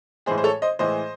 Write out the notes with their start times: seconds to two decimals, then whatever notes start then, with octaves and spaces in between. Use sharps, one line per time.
0.26 A2 E3 G#3 G#4 C5
0.38 C5
0.44 A4 C#5
0.62 C5 D#5
0.79 A2 E3 G#3 C5 D#5